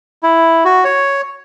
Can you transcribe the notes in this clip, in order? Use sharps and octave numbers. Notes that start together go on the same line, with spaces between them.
E4
F#4
C#5